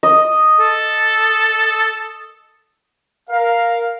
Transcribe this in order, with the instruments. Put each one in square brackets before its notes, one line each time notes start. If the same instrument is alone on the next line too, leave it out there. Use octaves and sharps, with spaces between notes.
[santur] D#5
[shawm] A4
[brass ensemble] A#4 F5